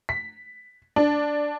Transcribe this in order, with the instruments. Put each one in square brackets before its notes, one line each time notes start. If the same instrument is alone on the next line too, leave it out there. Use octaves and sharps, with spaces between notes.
[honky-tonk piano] B6
D4